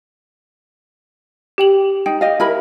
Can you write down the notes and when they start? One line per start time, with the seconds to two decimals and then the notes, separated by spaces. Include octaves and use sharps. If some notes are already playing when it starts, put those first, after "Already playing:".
1.58 G4 G5 F#7
2.06 D#4 G5
2.21 G4 D#5 F5
2.40 E4 A#4 B5